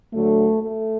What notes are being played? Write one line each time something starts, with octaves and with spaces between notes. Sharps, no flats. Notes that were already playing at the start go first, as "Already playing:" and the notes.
D2 D3 F#3 A3
A3